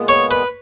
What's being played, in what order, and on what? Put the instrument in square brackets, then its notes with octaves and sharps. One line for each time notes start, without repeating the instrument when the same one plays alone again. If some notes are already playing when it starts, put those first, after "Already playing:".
Already playing: [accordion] A#2 G#3 B3
[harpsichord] C#5
B4